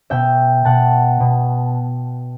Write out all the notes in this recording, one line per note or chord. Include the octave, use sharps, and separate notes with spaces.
B2 E5 G5
B2 F#5 A5
B2